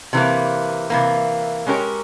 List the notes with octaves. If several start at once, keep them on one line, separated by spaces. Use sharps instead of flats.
C3 E3 A#3
C3 E3 A#3
G#3 C#4 G4 A#4 C#5